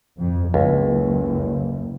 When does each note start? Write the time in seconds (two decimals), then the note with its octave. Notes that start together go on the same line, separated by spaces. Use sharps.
0.19 F2
0.54 F#1 C#2